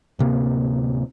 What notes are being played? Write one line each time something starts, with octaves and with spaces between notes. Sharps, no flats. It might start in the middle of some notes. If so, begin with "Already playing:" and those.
D1 C3 A#3